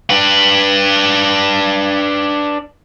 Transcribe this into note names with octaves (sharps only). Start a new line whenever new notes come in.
D4 B4